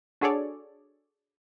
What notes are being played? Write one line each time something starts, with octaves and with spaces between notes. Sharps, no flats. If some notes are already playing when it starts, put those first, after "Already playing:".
D4 F#4 G#4 A4 C#5 D5